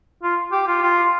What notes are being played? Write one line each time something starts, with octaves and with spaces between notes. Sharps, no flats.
F4
G4
F4
F4